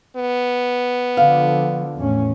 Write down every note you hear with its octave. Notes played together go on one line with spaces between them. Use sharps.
B3
D3 F3 F5
E2 A2 C#4